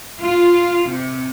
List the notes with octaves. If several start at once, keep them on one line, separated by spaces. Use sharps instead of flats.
F4
C3